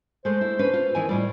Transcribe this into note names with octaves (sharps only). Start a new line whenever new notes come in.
G#3 A3 C5
E4
C#4 D4 B4
F4
D#3 E3 G#5
A2 G3 D5